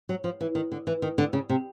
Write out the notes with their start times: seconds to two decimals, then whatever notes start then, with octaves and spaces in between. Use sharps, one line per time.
0.09 F#3
0.24 F3
0.41 E3
0.55 D#3
0.72 D3
0.87 E3
1.02 D#3
1.18 D3
1.33 C#3
1.50 C3